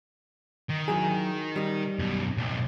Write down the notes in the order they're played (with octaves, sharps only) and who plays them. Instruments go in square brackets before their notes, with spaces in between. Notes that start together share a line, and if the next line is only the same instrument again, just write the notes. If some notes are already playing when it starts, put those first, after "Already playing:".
[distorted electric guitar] D#3
[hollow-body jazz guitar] F#3 E4 G#4
G3 D#4
[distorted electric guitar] F#2 B2
B1 A2